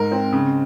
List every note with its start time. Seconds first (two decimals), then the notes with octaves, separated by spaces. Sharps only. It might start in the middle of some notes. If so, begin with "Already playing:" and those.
Already playing: G#2 A#4
0.12 C4
0.32 C#3